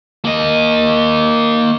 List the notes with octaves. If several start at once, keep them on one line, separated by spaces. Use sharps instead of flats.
A#3 D#5